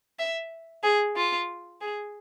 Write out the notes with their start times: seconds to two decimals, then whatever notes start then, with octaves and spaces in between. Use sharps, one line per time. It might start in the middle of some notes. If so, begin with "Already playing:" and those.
0.19 E5
0.83 G#4
1.16 F4
1.81 G#4